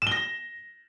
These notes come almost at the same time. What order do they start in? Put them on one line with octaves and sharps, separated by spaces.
E7 G7 A#6